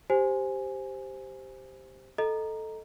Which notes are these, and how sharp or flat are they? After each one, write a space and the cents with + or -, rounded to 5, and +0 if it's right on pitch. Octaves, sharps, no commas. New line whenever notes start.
G4 +0 C5 +0 G#5 +0
A4 +0 D#5 +0 A#5 +0